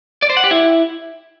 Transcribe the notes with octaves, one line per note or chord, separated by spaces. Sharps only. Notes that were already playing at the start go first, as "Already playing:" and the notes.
D5
C5
F#5
G4
E4